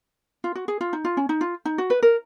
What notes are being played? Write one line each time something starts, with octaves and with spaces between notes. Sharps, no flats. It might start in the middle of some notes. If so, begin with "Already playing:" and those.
F4
F#4
G#4
F4
D#4
F4
C#4
D#4
F4
D#4
F#4
B4
A#4